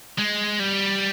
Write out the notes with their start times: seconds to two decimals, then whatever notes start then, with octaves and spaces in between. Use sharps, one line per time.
0.18 G#3
0.59 G3